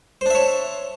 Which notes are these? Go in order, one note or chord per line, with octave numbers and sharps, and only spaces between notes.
D4 C5 C#5 E5